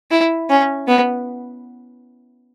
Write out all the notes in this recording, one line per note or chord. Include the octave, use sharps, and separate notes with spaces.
E4
C#4
B3